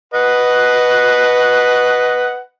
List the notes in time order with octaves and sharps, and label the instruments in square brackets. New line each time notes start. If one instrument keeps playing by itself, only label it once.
[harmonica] B4 D#5 F#5